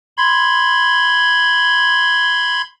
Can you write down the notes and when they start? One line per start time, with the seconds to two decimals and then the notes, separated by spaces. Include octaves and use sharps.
0.18 B5 C6 G#6